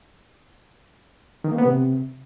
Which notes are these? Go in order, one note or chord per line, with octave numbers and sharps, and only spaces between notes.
D#3
A#3
B3
C3